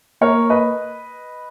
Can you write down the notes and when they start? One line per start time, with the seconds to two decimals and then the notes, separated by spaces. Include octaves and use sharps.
0.22 A#3 A#4 C#5
0.50 B4 D#5